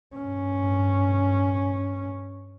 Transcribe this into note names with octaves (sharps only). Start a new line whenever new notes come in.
G2 C#4